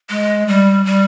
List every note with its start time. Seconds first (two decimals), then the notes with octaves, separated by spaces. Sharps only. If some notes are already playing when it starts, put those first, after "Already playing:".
0.10 G#3
0.48 G3
0.85 G3